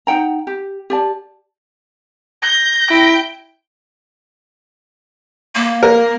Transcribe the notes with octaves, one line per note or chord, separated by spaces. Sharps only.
D#4 F#5 G5 A#5
G4
G4 D5 A5
G6 A#6
E4 G5
A#3
A#4